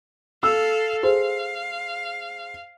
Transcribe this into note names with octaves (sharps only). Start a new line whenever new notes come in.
A4 F5 E6
G#4 C5 F5